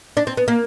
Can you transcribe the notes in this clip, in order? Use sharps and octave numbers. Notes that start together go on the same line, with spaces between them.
D4
C4
B3
A#3